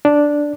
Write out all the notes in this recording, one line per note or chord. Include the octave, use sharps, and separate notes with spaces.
D4